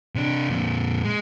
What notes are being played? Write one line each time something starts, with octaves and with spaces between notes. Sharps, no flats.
C3 D4
F2 A#2
G#3